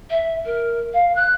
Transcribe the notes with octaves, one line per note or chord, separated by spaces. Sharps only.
E5
A#4
F5
F#6